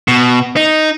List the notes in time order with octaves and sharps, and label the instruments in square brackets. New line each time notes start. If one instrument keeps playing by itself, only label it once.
[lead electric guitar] B2
D#4